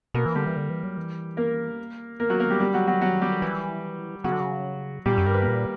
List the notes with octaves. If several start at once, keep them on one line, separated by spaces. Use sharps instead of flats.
B2 A#3 A#4
E3
D3 G3 G4
E3
D3
E3
F#3
E3
A#3 A#4
A#3 A#4
F#3 F#4
A#3 A#4
G3 G4
G3 G4
F#3 F#4
F#3 F#4
F#3 F#4
G3 G4
E3
C#3 F#3 F#4
D3
C#3
A#2 G3 G4
F#2
G2 A#4
B4
A#3 A#4
A#2